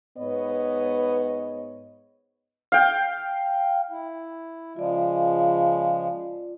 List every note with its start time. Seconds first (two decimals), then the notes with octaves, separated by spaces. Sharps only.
0.16 G#2 B3 B4 C#5 D#5
2.72 F5 G5
3.91 E4
4.76 C#3 F3 G#3 F4 D5